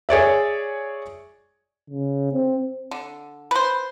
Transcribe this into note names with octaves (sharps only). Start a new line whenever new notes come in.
G#4 C#5 D5 E5
C#3
C4
D3
B4 C5